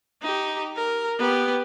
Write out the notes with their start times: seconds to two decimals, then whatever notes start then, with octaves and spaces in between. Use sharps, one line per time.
0.22 D#4 G4
0.76 A#4
1.19 B3 G4